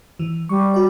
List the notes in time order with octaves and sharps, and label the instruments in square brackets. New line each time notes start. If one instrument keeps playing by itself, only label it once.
[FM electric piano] E3
[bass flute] G3 [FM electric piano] C#6
[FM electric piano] F#4 D5